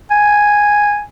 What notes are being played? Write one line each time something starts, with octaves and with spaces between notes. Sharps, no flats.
G#5